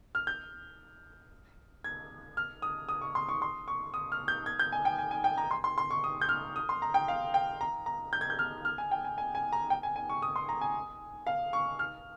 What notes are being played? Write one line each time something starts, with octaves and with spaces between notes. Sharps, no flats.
F6
G6
G#6
F6
D#6
D#6
C#6
C6
C#6
C6
C#6
D#6
F6
G6
G#6
G6
G#5
G5
G#5
G#5
G5
A#5
C6
C6
C6
C#6
D#6
G6
F6
D#6
C6
A#5
G5
F5
G5
A#5
A#5
G6
G#6
G6
F6
F6
G#5
G5
G#5
G#5
G#5
A#5
G5
G#5
G#5
C#6
D#6
C6
A#5
G#5
F5
C#6
F6